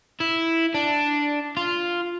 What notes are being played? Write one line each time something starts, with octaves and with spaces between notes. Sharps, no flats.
E4
D4
F4